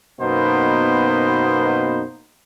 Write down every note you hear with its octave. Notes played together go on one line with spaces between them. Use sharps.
F#2 B2 A#3 B3 D#4 C5